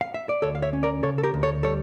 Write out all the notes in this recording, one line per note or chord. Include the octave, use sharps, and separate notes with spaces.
F5
E5
D5
D2 A4 C#5
F5
C#5 E5
C#4
A#4 D5
C#3 A4 C#5
A4
G4 A#4
D2
A4 C#5
G3 A4 C#5